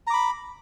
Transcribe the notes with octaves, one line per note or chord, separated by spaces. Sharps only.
A#5 B5 D6